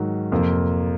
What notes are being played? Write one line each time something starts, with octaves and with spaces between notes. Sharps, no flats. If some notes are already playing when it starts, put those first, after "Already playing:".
Already playing: G#2 D#3 F#3
F2 C3 F3 A#3